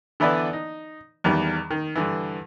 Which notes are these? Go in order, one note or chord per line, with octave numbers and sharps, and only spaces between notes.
D3 E3 B3 E4 B4 D5
D#4
E2 D#3 G3
D#3
G2 D3 E3